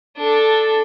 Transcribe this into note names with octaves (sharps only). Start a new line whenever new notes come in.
D4 A4